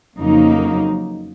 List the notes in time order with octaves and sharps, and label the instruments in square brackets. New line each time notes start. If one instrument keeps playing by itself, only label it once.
[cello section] F2 C#3 F#3 A#3 D#4